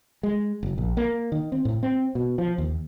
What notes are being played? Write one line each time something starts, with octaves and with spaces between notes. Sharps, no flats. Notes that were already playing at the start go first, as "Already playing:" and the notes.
G#3
F#1
A#1
A#3
D#3
C4
A2
C4
B2
F3
D#2